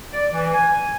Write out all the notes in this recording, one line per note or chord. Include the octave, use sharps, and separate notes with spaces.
D5
E3
G#5